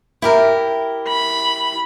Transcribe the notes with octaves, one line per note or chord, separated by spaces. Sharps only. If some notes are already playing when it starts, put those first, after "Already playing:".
E4 G4 A#4
B5